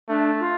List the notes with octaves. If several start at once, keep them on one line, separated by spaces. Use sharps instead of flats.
A3 D4
F4